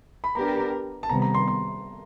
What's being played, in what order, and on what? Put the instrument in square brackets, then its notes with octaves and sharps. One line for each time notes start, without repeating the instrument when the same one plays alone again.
[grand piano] B5
[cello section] B3 D4 G4 A#4 [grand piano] A#5
[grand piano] A5
[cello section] C3 D#3 G3 B3 [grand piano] A#5
[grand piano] A#5
C6
C6